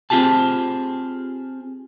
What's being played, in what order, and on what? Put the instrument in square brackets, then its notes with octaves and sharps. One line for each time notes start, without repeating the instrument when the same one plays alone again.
[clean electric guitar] C4 F4 G4 G#4 A5